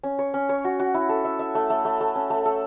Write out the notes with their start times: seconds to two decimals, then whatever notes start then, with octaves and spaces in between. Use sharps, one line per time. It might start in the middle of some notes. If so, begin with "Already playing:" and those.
0.03 C#4
0.19 C#5
0.34 C#4
0.49 C#5
0.65 F#4
0.80 F#4
0.94 E4
1.09 A4
1.25 E5
1.39 E5
1.55 A3
1.70 A3
1.85 A3
2.01 A3
2.15 C#4
2.30 A3
2.46 A4